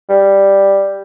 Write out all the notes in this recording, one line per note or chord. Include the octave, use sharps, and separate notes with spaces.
G3